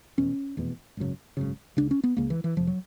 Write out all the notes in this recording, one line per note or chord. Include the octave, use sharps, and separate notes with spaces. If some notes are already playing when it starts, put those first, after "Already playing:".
F1 E2 B2 C#4
F1 E2 B2
G#1 F#2 C#3
G#1 F#2 C#3
C#2 C#3 D4
C#4
B3
C#2 C#3 A#3
E3
E3
F1 F2 C3 F3
F#3